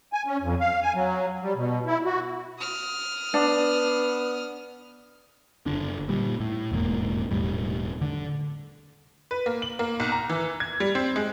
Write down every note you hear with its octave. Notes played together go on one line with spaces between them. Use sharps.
G#5
C#4
F2
F5
G#5
F#3
G3
B2
E4
F#4
D#6 F6
B3 D4
F#1 D3 D4
A#2 G3
A2
E1 A1 G#2 A#3
E1 A2 G3
D3
B4
A#3
F#7
A#3
B1
A#5
E3
G#6
G3
C4
G#3